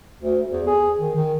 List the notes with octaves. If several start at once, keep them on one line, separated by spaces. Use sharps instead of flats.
D2
E2
G#4
D#3
D#3